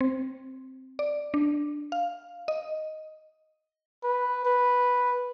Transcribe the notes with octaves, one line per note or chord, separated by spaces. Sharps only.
C4
D5
D4
F5
D#5
B4
B4